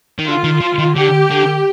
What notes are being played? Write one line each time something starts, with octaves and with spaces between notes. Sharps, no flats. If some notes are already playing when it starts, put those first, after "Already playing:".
D#3
D3 F4
D#3
F3
D#3
D3 G4
D3